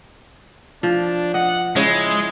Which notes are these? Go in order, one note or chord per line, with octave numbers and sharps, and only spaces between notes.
F3 D4
D#5 F#5
C#3 G#3 E4 C#5